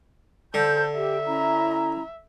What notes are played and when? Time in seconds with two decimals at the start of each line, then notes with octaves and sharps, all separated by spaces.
0.54 D3 A4 C5 G6
0.96 G4 E5
1.26 C#4 E4 A#5